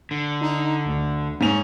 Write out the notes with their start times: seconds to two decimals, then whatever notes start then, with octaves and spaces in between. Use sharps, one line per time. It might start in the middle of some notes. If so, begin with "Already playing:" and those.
0.11 D3
0.41 D#4
0.86 D2
1.41 G#2 C#4 F7